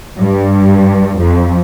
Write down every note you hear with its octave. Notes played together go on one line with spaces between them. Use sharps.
G2
F2